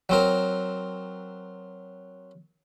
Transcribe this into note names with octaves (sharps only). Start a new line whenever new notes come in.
F#3 C4 A#4